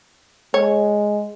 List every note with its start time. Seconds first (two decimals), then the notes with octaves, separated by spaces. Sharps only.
0.54 G#3 C#5